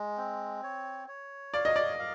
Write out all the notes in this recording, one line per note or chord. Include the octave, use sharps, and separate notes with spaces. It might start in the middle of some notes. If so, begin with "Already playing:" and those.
Already playing: G#3
C4
C#5
C#5
D5 F5
D#5
D5
F5